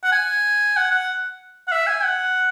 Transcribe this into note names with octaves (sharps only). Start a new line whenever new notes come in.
F#5
G#5
F#5
F#5
F#5
E5
G#5
F#5